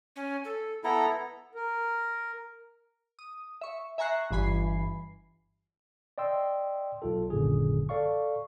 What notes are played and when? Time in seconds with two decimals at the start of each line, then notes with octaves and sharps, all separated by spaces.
0.16 C#4
0.45 A4
0.84 B3 E4 A4 A#5
1.55 A#4
3.19 D#6
3.61 E5 C#6
3.98 E5 G#5 A#5 C#6 F#6 C7
4.31 G1 G2 E3 G#5 B5 C7
6.18 D5 D#5 G5 C6 E6
7.02 B1 F4 A4
7.30 G#1 F#2 A#2 D3 G#4
7.89 A4 D5 F5 C#6